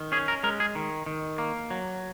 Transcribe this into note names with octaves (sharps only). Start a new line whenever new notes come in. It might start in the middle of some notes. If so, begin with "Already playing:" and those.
Already playing: D#3
C#4 G#4
A#4
G#3 A#4
G#4
D#3
D#3
A#3
F#3